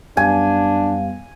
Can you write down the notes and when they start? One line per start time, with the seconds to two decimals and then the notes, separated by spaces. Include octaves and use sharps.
0.17 F#2 G3 B3 D4 F5 G#5